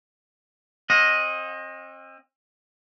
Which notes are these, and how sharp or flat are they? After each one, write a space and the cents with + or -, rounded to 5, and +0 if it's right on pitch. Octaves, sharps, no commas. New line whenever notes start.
C4 +35 D#5 +0 F#5 -40